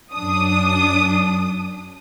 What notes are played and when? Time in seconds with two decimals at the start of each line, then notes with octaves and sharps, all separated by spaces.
0.13 F#2 D4 D#6